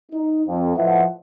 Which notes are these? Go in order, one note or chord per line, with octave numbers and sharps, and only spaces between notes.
D#4
F2
A2 F3 B4 D#5 E5 F#5